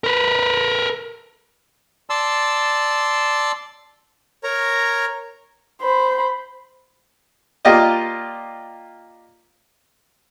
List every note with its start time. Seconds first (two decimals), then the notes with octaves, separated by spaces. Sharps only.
0.04 A#4 B4
2.10 D5 A5 C6 E6
4.44 A#4 C#5 A#5
5.82 C5 B5
7.65 A#3 F4 G4 D5 D#5